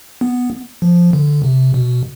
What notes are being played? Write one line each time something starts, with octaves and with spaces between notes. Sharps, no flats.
B3
F3
D3
C3
B2